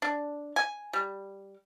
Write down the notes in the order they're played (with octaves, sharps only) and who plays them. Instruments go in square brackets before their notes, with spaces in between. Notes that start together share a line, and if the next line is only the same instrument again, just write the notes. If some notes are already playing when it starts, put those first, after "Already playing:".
[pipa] D4
G#5
G3